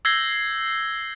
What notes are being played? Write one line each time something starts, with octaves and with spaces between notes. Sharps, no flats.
E6 G6 G#6 A#6 C7 G7